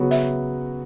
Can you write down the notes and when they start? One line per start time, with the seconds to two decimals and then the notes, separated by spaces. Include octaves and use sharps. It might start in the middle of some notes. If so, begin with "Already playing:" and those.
Already playing: C#3 F#3 B3 F#4
0.11 E5